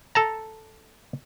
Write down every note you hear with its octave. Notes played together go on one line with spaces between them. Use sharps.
A4 A5 A#5